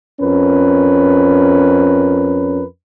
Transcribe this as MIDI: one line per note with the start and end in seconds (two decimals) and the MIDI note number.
0.21 2.63 41
0.21 2.63 61
0.21 2.63 70
0.21 2.63 71